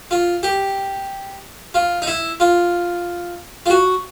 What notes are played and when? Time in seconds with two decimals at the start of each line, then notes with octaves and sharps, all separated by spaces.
0.11 F4
0.43 G4
1.74 F4
2.02 D#4
2.07 E4
2.40 F4
3.66 F4
3.70 F#4